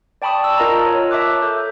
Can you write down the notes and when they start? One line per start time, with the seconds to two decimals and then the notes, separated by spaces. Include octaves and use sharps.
0.22 D5 G5 A5 B5 C#6 D#6
0.43 A5 E6
0.58 F4 A#4 D#5 A5 A#5
0.86 C#5
1.11 E5 A5 D6 F#6
1.42 A4 G6